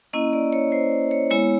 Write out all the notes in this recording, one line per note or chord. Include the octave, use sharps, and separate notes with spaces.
A#3 C#4 E4 D#5
D5
C#5
C5
C#5
G#3 B3 E4 C#5